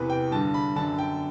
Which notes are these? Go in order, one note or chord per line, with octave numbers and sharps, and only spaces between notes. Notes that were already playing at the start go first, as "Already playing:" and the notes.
Already playing: E2 C3 E3 B4
G5
G2 D3 A5
B5
F#2 D3 A5
G5